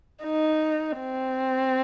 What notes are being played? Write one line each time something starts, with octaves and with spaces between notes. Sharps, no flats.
D#4
C4